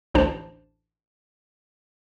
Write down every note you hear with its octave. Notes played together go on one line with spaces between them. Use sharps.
A1 D2 D4 C5 A5